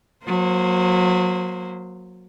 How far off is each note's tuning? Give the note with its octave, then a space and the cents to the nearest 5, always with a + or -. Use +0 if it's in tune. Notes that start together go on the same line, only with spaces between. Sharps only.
F#3 -25 A#3 +0 C5 +0